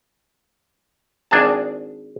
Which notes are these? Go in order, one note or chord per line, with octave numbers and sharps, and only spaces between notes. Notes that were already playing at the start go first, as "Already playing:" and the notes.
G#1 D4 G#4 A5